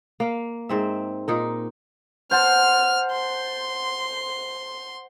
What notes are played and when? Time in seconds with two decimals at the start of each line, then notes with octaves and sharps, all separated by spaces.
0.20 A#3 F5
0.69 G#2 C4 E5
1.28 A#2 D#4 A#4
2.31 C5 F#5 A5 F6
3.12 C6